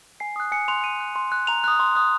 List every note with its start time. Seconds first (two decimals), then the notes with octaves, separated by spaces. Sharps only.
0.20 G#5 C7
0.36 D#6 F#6
0.52 G#5 C#7
0.68 C6 F#6 F7
0.84 C6 D#7
1.00 F#6
1.16 C6
1.32 F#6
1.47 A#5 F7
1.64 D#6 F#6
1.80 C6
1.95 D#6 F#6